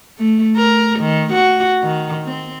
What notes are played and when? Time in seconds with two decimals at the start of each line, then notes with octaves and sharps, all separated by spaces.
0.19 A3
0.56 A#4
1.00 D#3
1.33 F#4
1.83 D#3
2.25 C4